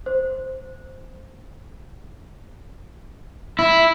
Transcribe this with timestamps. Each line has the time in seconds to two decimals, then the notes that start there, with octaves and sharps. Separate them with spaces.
0.06 C5
3.59 E4